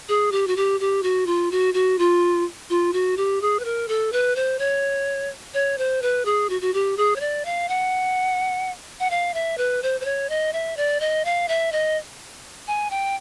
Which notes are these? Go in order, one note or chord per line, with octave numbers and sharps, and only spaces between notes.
G#4
G4
F#4
G4
G4
F#4
F4
F#4
F#4
F4
F4
F#4
G4
G#4
B4
A#4
A4
B4
C5
C#5
C#5
C5
B4
G#4
F#4
F#4
G4
G#4
C#5
D5
F5
F#5
F#5
F5
E5
B4
C5
C5
C#5
D#5
E5
D5
D#5
F5
E5
D#5
G#5
G5